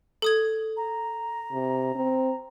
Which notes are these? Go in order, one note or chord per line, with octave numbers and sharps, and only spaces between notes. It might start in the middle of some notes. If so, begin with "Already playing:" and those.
A4 D#6 G#6
A#5
C3
C4